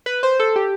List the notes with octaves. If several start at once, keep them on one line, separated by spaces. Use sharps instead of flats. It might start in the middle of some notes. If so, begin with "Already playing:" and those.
B4
C5
A4
G4